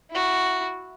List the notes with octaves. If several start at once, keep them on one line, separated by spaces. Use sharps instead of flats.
E4 F#4